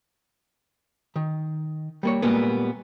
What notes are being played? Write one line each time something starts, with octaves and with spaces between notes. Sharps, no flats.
D#3
G3 A#3 C#5
A#2 C#3 G3 G#3 A#3 B3